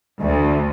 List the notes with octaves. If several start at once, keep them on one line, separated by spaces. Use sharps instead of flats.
D2